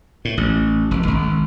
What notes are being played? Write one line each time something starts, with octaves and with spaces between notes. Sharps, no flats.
A2
A1
F1
G#1